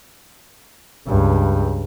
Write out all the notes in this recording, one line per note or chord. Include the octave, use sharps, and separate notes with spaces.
C#2 G2